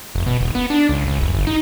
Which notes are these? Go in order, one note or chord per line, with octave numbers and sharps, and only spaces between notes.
F1
B2
D#1
B3
D4
C#2
C#2
F1
G1
D#4